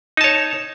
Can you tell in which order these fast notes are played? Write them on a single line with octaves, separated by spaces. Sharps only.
D#4 A5 C#5